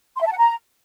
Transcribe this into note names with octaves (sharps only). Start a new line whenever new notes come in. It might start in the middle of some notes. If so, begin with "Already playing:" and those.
C6
E5
A5
F#5
A#5